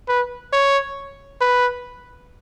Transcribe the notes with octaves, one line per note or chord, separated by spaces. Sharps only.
B4
C#5
B4